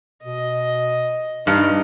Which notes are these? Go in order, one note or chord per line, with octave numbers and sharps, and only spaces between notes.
B2 D#5
G2 D#4 G4